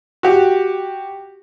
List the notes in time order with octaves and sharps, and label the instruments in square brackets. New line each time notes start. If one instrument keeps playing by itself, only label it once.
[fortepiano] F#4 G4